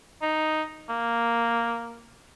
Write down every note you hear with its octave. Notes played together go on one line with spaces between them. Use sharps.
D#4
A#3